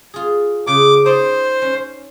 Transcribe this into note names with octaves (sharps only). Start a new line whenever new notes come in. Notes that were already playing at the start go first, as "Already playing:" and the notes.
F4 G#4
C#3 D6
D#4 C5 D5
C#4